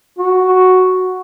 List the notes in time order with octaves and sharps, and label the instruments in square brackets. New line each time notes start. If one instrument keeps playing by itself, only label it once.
[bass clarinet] F#4